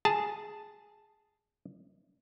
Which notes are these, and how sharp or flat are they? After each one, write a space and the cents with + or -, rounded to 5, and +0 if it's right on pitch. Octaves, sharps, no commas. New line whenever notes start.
G#4 +0 A5 +0